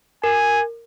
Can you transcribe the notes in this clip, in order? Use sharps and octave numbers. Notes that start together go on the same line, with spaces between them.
A#4 G#5